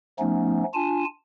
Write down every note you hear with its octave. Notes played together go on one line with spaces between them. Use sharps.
F3 A3 B3 C#4 D#4
D4 F4 G#5 A5